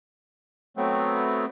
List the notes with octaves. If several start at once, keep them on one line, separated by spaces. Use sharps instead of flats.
F#3 A3 B3 C4